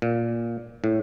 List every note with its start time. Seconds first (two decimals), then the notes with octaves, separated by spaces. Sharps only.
0.02 A#2
0.84 A2